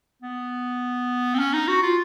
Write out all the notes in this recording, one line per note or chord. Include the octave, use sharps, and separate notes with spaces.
B3
C4
C#4
D#4
F#4
F4